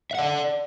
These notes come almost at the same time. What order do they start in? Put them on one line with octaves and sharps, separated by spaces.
E5 F#5 D5